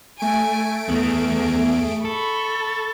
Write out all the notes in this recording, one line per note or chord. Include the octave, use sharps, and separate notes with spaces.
A3 G#5 D7
E2 B3 G#4
A4 B5 C#6